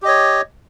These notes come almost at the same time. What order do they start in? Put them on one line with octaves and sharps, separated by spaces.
G4 D#5 C#5